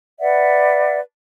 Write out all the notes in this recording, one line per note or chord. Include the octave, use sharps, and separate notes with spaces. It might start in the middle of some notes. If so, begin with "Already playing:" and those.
B4 D5 E5 F#5